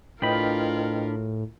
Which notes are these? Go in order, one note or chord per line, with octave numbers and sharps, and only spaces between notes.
A2 D4 F4 A#4 B4 D#5 G5 B5